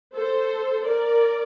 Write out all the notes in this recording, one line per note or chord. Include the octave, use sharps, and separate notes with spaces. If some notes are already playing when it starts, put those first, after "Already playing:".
A4 C5
A#4 D5